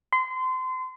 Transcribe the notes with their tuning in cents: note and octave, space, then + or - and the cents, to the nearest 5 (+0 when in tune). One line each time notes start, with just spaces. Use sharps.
C6 -30